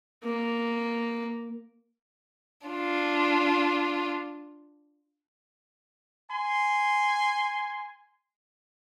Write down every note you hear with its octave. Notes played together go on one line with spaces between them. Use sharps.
A#3
D4 F4
G#5 C6